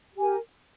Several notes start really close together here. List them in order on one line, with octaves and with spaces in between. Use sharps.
G4 G#5 A#4